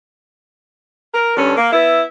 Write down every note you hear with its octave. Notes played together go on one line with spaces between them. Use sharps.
A#4
G2 D3 C#4
A#3
B3 E4 E5